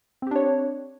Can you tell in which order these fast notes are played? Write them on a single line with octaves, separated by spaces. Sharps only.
C4 G4 D4 C#5